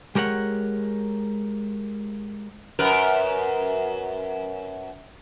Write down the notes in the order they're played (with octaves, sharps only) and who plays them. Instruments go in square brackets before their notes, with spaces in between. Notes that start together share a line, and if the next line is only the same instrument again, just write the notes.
[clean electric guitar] G#3 G4 A#4 C#5 F#5
[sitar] F#2 A#4 B4